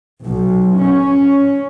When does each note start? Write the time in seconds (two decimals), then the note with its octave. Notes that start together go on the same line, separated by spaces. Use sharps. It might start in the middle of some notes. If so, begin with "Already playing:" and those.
0.24 B1
0.79 C#4